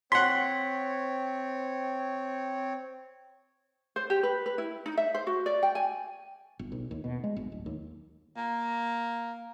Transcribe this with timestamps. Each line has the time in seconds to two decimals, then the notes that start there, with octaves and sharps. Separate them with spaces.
0.12 C4 C#5 F#5 C6 B6
3.96 C5
4.10 G4
4.23 B4
4.46 B4
4.58 E4
4.86 D#4
4.97 E5
5.15 C5
5.27 F#4
5.46 D5
5.63 G5
5.75 G#5
6.59 G1
6.72 B1
6.91 D#2
7.04 B2
7.24 G#3
7.36 G1
7.52 D1
7.66 D#2
8.37 A#3